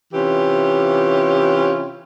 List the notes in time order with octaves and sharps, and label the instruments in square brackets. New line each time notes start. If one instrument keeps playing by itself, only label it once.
[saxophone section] C3 E3 C#4 F4 G4